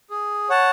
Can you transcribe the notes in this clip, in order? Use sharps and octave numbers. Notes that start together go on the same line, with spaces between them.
G#4
C#5 F#5 A5